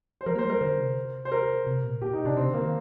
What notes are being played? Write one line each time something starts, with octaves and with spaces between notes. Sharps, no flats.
C5
F3 A#4
A#3
C5
G3
A#4
D3 C5
C3
C5
A#4
C3
A#2
A#2 G4
D#4
C3 D4
C3 C4
D3
A#3
D#3